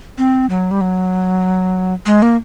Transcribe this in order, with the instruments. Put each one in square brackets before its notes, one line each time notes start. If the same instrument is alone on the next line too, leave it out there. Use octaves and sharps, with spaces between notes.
[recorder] C4
F#3
G3
F#3
G#3
A#3